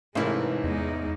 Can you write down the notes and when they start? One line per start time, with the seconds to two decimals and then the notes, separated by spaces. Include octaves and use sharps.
0.15 A1 G#2 C3 E3 G#3 E4 A#4
0.64 E2 G#3 D#4